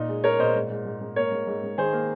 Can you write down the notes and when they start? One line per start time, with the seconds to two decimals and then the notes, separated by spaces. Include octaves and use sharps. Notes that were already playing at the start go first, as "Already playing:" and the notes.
Already playing: A#2 D#4
0.09 G#3
0.24 G#3 A#4 C#5
0.39 A#2 C5 D#5
0.54 G#2
0.70 G#2
0.86 G#2
1.01 G#2
1.16 A#3 A#4 C#5
1.32 G#2
1.47 G#2
1.63 G#2
1.78 D#3 G#4 C5
1.93 A#3